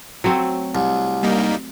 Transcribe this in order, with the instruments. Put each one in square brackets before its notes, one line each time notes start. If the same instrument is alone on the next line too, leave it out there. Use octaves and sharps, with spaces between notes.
[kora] F#3 A3 C4
[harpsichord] C2
[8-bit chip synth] G3 A#3 D#4